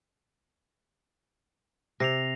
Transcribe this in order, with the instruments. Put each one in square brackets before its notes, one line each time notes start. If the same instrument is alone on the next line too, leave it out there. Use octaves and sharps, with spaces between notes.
[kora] C3 [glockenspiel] A#6 C7 F7